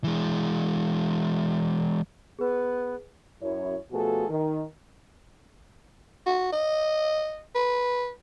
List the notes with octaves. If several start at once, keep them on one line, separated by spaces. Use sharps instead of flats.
E3 G#3
B3 G#4 B4
F#2 E4 C#5
B2 F3 A3 F#4 G#4 A4
D#3
F#4
D#5
B4